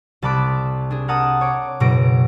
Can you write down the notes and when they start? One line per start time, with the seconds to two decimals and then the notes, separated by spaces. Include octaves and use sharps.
0.22 C2 A5 B5 D6 F#6
0.91 D4 G#4
1.08 A#4 F#5 A5 D#6
1.41 C#5 D6
1.80 F#1 B2 A#6 D7